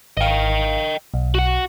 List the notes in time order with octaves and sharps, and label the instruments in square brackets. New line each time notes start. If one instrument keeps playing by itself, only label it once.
[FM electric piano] G#1 F5 [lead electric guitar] D#5 G5
[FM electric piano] B1
[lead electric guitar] F#4 F#5